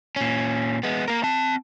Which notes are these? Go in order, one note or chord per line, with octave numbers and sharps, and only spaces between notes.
A#2 C#4
G#3 B3
A#3 A#4
C4 A5